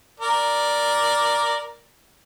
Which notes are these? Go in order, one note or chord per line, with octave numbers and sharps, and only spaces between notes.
A#4 D5